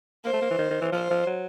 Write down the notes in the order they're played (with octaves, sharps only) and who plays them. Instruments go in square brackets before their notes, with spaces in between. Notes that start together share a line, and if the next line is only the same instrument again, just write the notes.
[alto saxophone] A#3 [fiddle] C5
[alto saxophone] A3
A#3
E3
D#3
D#3
E3
[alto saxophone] F3 [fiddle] C5
[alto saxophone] F3
F#3